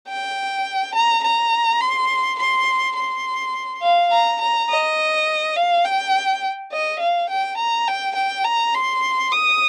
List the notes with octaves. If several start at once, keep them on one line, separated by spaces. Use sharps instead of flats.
G5
A#5
A#5
C6
C6
C6
F5
A#5
A#5
D#5
F5
G5
D#5
F5
G5
A#5
G5
G5
A#5
C6
D#6